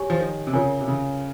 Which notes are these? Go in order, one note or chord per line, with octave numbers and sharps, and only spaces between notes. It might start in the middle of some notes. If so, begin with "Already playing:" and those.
Already playing: G4 C#5 G#5 C#6
F3
D#3
C3
C#3 F4 A#4 C#5 G#5
C3
C#3